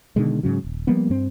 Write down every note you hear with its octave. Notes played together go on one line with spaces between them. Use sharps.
B2 D3 D#3 G#3
G#2 C#3 F#3
D#1
F3 G3 A#3 B3
G2 C4